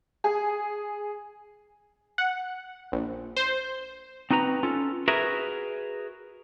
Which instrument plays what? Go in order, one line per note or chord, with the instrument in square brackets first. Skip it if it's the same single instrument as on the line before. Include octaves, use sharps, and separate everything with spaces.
[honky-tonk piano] G#4
[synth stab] F#5
A#1
C5
[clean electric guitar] C4 D#4 F#4 B4 A#5
C#4 F4 A4
F#4 G#4 A#4 B4 E5